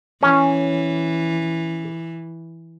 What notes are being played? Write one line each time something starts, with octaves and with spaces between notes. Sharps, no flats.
E3 C#4